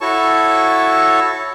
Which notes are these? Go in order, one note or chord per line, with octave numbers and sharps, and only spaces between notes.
E4 F#4 A4 C#5 A5 C#6